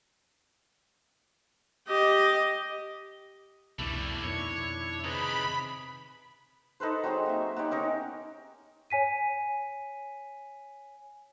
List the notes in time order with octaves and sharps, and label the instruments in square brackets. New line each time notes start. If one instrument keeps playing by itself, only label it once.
[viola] G4 D#5
[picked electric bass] C2 F2 B2 [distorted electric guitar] G3 A3 [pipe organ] D4 E4
[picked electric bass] F2 B2 D#3 [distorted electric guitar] C#5
[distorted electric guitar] C3 [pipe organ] D#4 G#4 B4 [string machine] B5
[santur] D#4 A4 B4 C5
F#3 C4 D#4 G#4
A#3 E5
B3 D#4 G4 C#5
C#4 D#4 A#4
[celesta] C#5 G#5 B6 D#7